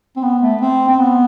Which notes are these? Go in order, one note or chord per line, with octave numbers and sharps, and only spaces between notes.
C4
B3
A3
C4
C4
B3